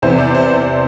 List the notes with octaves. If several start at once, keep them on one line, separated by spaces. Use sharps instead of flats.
E2 C3 E3 C5
D5
C5
C5